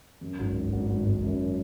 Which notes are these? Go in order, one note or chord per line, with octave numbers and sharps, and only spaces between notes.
F#2
G#1
G#1
G#1
G#1
G#1
F#2